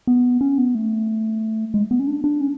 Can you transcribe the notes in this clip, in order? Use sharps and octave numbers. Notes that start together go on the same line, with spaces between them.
B3
C#4
B3
A3
G#3
B3
C#4
D4
D4
C#4